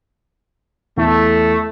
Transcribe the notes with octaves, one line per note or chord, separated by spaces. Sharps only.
E2 A3